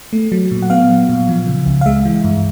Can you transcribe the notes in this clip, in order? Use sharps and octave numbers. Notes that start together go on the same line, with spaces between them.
A3
F#3
A#2
F#5
B3 F5
F#3
A#2
F3
C#3
C#2
F5
G#3 E5
E3
G2